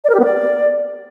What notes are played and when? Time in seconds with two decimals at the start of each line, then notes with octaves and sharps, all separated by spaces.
0.04 D5
0.09 A#4
0.14 G4
0.19 B3
0.24 D5